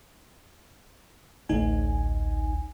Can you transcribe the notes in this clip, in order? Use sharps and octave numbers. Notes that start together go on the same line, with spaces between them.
A1 D2 D#4 G#5